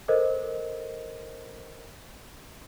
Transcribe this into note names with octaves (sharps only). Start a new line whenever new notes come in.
A4 A#4 C5 D#5